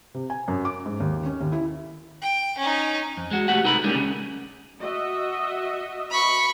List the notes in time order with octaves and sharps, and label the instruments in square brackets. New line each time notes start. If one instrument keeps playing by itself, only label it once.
[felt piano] C3
G#5
F#2
D6
G#2
D#2
C#4
D#2
E4
[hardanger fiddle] G5
C#4 D#4
[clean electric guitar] F2
G#3 F#4
A3 F#4 G4 F#5
C2 D#4 A4 B4 B5
G3 G#3 A#3 C#4 D4
C#2 C#3
[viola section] F#4 D#5 E5
[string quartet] B5 C#6